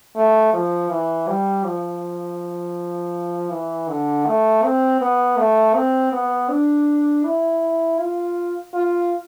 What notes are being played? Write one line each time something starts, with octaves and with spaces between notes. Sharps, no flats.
A3
F3
E3
G3
F3
E3
D3
A3
C4
B3
A3
C4
B3
D4
E4
F4
F4